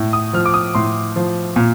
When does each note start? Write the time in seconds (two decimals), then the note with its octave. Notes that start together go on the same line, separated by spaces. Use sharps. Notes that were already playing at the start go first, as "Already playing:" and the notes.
Already playing: A2
0.13 D#6
0.33 F3 F6
0.46 D6
0.54 D#6
0.75 A2 C6
1.16 F3
1.56 A#2